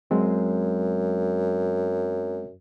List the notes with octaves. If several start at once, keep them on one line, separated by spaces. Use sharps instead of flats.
F#2 F#3 G#3 C4